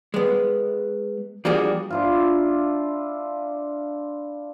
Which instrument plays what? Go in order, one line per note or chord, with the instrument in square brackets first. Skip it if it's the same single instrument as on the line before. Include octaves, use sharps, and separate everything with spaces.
[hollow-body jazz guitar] G#3 B3
F3 G3 A#3 D4 F#4 G#4
[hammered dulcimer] D4 E4 F4